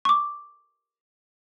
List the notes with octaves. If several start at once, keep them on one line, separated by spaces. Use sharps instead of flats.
C#6 D6